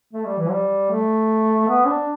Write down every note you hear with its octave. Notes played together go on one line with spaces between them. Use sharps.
A3
G3
E3
G3
A3
B3
D4